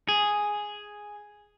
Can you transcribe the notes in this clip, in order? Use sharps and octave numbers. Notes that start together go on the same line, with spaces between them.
G#4